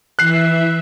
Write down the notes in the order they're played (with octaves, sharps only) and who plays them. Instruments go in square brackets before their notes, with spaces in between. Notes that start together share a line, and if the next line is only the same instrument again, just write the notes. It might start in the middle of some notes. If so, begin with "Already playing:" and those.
[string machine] E3 E5 [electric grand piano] F#6 C7